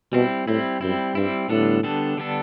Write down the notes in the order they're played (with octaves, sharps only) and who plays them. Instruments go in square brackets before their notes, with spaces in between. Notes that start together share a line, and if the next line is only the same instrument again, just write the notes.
[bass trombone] B2 [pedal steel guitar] G3 C4 E4
[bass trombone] A2 [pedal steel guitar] G3 C4 E4
[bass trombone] F#2 [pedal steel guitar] G3 C4 E4
[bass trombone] G2 [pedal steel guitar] G3 C4 E4
[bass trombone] A2 [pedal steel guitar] D3 G3 B3 D4 A4
[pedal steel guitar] D3 G3 B3 D4 A4
D3 G3 B3 D4 A4